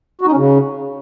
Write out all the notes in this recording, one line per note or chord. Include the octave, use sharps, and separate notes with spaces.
F#4
D#4
C#4
C#3